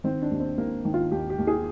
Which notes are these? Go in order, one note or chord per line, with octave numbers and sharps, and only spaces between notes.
D#3 C4
D4
D#2
C4
D#2 A#3
D#3
F4
D#2 G4
G4
D#2
G#4